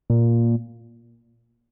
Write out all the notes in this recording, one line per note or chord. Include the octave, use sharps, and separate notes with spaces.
A#2